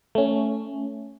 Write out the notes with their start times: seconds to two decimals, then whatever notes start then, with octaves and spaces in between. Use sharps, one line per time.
0.15 A3 C#4